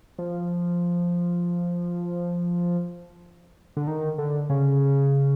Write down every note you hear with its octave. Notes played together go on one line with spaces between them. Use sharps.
F3
D3
D#3
D3
C#3